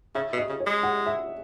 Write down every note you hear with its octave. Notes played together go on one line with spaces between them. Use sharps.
C#3 E5
B2
D#5
C#3
C#5
G#3
F#5
E5